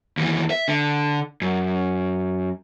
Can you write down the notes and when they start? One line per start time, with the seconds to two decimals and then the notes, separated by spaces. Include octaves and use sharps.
0.17 D#2 E3
0.50 E5
0.68 D3
1.42 F#2